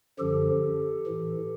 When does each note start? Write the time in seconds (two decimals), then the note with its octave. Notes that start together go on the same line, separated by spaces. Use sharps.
0.19 F#2 D3 F3 G4 A4
1.06 A2 E3